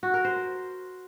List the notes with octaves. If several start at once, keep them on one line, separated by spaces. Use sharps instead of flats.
F#4
A#4
C5